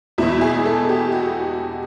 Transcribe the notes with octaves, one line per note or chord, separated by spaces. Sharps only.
E2 B2 E4
G#4
A4
G4
F#4